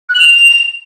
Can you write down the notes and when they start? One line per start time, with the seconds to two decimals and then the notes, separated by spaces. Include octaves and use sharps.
0.09 F#6
0.14 F#7
0.19 F7